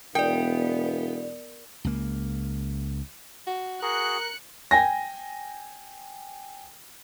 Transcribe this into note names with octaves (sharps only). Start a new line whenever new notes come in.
E1 B3 A#4 D5 G5
C#2 A#3
F#4
F#4 G#4 A#4 F#6 C#7
G5 G#5 A#6